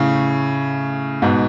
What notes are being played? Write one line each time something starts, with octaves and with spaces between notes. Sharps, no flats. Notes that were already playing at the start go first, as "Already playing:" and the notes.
Already playing: A2 C#3
G#2 B2